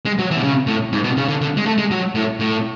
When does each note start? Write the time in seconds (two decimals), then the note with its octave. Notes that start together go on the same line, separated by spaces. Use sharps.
0.05 G#3
0.19 F#3
0.31 E3
0.36 B2
0.43 C#3
0.67 A2
0.93 G#2
1.04 B2
1.17 C#3
1.29 D3
1.41 D3
1.57 G#3
1.66 A3
1.78 G#3
1.91 F#3
2.15 A2
2.40 A2